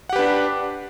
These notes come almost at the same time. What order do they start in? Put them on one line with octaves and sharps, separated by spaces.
F#5 G4 B4 D4